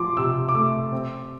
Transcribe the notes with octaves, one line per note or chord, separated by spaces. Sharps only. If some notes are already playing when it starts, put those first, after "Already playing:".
Already playing: F3 C6 D6
C3 E6
D6
A3 E6
C4